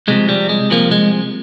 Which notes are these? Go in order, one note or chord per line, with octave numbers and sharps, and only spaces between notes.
C2 C3 F3 G#3
G3
G#3
C2 C3 F3 A#3
G#3